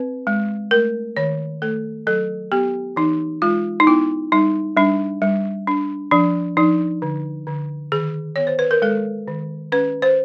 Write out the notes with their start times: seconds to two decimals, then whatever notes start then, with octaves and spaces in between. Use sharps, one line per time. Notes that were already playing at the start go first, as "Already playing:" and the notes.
Already playing: C4 B4
0.27 G#3
0.71 A3 A#4
1.17 D#3 C#5
1.62 A3 A4
2.07 F#3 A4
2.52 B3 G4
2.96 E3 D#4
3.42 G#3 F4
3.80 D#4
3.87 B3 E4
4.32 G3 D#4
4.77 G3 D4
5.22 G3
5.67 D4
6.11 F3 D4
6.57 F3 D#4
7.02 D3
7.47 D3
7.92 D#3 G#4
8.36 B3 C#5
8.47 C5
8.59 B4
8.71 A#4
8.82 G#3 A4
9.28 D#3
9.72 C#4 B4
10.02 C5